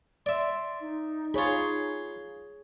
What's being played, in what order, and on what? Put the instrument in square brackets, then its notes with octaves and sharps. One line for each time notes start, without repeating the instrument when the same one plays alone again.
[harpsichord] D5 E5 [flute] C6
[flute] D#4
[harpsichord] F4 B5 [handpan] G#4 C#5